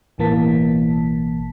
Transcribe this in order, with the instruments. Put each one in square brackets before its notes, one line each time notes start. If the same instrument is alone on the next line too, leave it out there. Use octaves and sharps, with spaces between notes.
[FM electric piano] A1 B2 E3 A#3 A5 B6